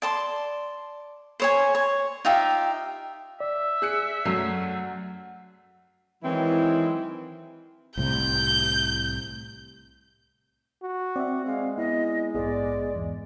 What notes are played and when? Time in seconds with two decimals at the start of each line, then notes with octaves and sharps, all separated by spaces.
0.02 D5 A5 C6
1.40 C5 C#5 G#5
1.75 C#5
2.25 D#4 F4 G4 E5
3.40 D5 E5
3.82 G#4 F#6 C#7
4.25 F#2 F#3 A3 C7
6.24 D#3 E3 F#3 G#3 C4 E4
7.97 C2 A2 C3 G6
10.83 F#4
11.16 C4 D5 E5
11.46 G#3 F5
11.77 B3 E4 D#5
12.35 A#1 G#2 B3 G#4 D5
12.95 E2 G#2